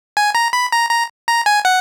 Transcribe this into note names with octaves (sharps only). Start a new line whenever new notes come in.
G#5
A#5
B5
A#5
A#5
A#5
G#5
F#5